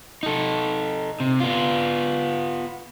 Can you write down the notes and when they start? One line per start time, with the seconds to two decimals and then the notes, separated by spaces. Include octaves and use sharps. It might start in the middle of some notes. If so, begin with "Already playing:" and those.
0.23 D#4 A4
1.20 C3
1.40 B3 F4